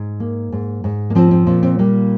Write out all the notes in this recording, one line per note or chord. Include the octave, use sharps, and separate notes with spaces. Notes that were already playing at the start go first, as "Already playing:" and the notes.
Already playing: G#2
A#3
G#2
G#2
A#3
F3 C4
C4
A#2 C4
C4
G3 A#3